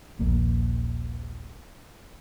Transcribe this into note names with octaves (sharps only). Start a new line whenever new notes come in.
D#1 A#1 A#3